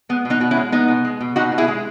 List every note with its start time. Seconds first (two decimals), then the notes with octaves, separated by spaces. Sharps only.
0.09 G#3 B3
0.25 B2
0.30 B3 D#4
0.41 B2 F#4
0.51 C#4 E4
0.57 G#3
0.72 G#3 B3 D#4
0.88 B2
1.05 G#3
1.21 B2
1.36 B2 D#4 F#4
1.52 B2
1.58 E4 G#4
1.68 G#3